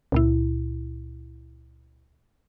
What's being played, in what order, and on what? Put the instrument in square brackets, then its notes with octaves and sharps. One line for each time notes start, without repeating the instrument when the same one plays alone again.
[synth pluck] C#2 A#2 E4